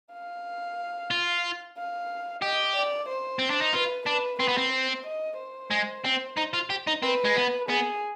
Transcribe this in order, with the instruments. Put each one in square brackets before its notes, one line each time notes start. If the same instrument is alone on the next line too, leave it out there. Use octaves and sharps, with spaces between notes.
[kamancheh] F5
[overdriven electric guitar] F4
[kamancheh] F5
[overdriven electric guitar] G4 [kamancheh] D#5
[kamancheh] D5
C5
[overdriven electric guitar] C4
D4
D#4
[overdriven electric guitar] F4 [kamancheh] B4
[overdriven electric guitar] D4 [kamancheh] B4
[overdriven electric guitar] C4 [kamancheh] B4
[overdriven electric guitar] B3
C4
[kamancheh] C5
D#5
C5
[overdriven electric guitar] G#3
C4
D#4
F4
G4
D#4
[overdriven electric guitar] C4 [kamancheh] B4
[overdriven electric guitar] G#3
B3
[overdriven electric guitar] B3 [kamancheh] G#4